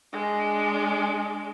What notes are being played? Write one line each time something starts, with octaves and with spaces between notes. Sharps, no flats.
G#3 D4